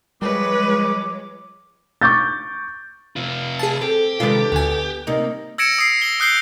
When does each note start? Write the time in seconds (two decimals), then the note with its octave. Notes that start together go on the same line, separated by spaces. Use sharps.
0.22 F3 G3 G#3 B4 C#5 D6
2.01 C#6 D6 G6 A6
3.16 C3 F4
3.59 G#4 A5
3.81 C4 G4 A4
4.20 C3 D#3 G#3 D4 F4 A4 B4
4.52 D2 D3 B3 G#5
5.07 C3 G3 A#3 D#4
5.58 E6 G#6 A#6 C#7 D7 E7
5.79 D#6 C7
6.02 A#6 G7
6.20 D#6 F#6 G6 C7 G7